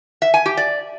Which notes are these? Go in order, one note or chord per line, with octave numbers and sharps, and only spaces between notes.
E5
G#5
G4
D5